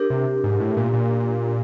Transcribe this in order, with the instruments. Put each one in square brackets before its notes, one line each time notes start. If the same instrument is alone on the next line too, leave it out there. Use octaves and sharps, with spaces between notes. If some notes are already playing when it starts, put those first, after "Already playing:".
Already playing: [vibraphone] D4 G4 A#4
[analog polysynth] C3
G#2
A2
A#2
A#2